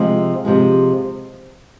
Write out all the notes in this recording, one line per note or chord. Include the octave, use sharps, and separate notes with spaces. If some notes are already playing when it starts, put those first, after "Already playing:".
Already playing: C3 F3 G#3
C3 F3 G#3